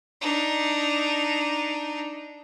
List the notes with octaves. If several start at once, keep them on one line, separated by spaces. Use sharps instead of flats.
D4 D#4